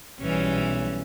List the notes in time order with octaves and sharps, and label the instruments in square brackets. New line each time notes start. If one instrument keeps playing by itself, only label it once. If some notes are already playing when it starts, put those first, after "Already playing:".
[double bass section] B1 [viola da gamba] E3 G3 C#4